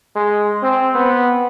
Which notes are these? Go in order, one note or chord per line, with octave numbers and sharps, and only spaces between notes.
G#3
C4
B3